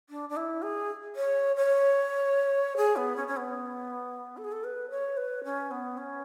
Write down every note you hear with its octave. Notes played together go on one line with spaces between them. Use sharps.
D4
D4
E4
G#4
C#5
C#5
G#4
B3
C#4
C#4
B3
A4
G#4
A4
B4
C#5
B4
C#4
B3
C#4